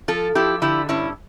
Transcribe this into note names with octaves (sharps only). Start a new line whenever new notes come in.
F3 F4 A4
F3 E4 G4
D3 E4 G4
G2 C#4 E4